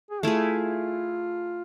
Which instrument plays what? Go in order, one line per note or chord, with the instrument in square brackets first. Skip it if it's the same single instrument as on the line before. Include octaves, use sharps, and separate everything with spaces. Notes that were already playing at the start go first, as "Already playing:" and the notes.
[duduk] G#4
[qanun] A3 E4 G#4 [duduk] F4